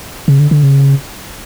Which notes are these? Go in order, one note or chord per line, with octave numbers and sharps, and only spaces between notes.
C#3
D3
D3
C#3